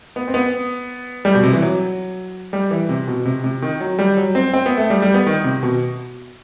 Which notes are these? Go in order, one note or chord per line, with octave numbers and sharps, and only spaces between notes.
B3
C4
B3
G3
B2
C3
E3
F#3
G3
E3
C3
B2
C3
C3
D#3
F#3
G3
F#3
C4
C4
B3
A3
G3
G3
B3
D#3
C3
B2